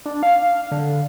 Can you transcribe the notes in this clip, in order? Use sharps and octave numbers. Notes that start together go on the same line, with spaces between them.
D4
F5
D3